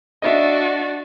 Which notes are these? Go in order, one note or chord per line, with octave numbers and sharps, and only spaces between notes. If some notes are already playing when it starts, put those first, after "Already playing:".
D4 F#4 D#5 E5 A6